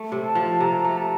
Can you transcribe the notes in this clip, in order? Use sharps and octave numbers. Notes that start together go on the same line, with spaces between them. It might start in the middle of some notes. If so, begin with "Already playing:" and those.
Already playing: A3
C3
A5
F3
C3 A#5
A3
A5